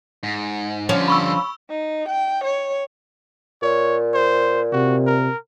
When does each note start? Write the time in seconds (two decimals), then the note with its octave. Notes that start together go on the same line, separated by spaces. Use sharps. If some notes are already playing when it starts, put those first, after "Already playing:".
0.23 G#2
0.89 D3 F3 G3 C#4
1.08 B5 C#6 E6
1.70 D#4
2.09 G5
2.45 C#5
3.62 A#2 C#5
4.14 C5
4.72 C3 F#4
5.07 A#4